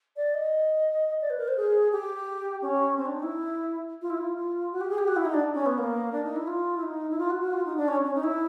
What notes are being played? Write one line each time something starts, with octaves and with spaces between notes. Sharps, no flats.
D5
D#5
D5
B4
A#4
C5
G#4
G4
C#4
C4
D4
D#4
E4
F4
E4
F4
F4
F#4
G4
G#4
G4
F#4
E4
D#4
D4
C#4
B3
A#3
D4
D#4
E4
F4
E4
D#4
E4
F4
F#4
F#4
F4
D#4
D4
C#4
C#4
D#4
E4